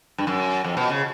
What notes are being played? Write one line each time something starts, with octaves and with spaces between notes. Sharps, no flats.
G2
F#2
F2
B2
C#3